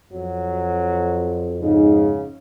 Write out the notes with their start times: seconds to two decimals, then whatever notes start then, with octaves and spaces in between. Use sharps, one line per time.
0.12 F2 F#3
1.62 G#2 C#3 D#4